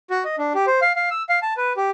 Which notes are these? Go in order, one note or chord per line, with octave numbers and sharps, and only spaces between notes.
F#4
D#5
D4
G4
C5
F5
F5
E6
F5
A5
B4
G4